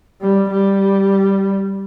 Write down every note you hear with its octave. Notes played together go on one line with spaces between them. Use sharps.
G3
G3